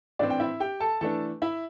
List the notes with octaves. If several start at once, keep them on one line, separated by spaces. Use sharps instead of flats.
A2 E3 C4 D4 D5
G5
E4 E5
G4 G5
A4 A5
E3 A3 D4 A4 A5
E4 E5